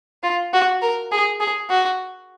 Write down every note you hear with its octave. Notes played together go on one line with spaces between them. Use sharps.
F4
F#4
A#4
G#4
G#4
F#4